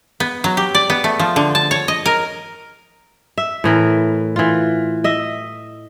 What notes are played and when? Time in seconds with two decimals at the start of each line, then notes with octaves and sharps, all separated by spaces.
0.20 B3
0.44 F#3
0.57 G4
0.75 D5
0.90 B3
1.04 A3
1.19 F3
1.36 D3
1.55 A5
1.71 C#5
1.88 D#5
2.06 A#4
3.38 E5
3.64 A2 E3 A#4
4.36 E3 F4
5.04 D#5 E5